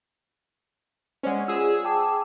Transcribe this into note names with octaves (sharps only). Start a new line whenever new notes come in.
G#3 C#4 C5 D5 F#5
F4 G#4 E6
G5 A5 D6